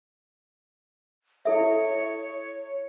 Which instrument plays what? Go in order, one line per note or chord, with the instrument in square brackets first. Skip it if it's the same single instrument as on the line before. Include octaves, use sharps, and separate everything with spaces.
[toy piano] E4 A4 E5 [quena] C#5